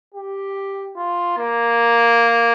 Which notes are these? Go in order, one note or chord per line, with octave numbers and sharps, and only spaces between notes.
G4
F4
A#3